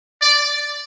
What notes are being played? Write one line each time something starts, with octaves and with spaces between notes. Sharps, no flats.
D5